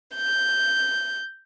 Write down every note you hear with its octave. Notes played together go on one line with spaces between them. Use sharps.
G6